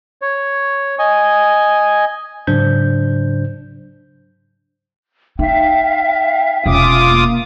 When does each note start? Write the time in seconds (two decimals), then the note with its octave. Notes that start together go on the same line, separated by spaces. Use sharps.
0.22 C#5
0.99 D#5 G#5
2.47 G#2 C#3 F#3 D4 C5 G6
5.39 D#4 E5 F5 G5
6.66 E1 C#4 F4 D6 D#6
7.09 A#3